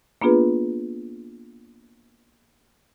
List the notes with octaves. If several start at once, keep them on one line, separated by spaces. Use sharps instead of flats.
A#3 B3 D4 F4 G#4 B4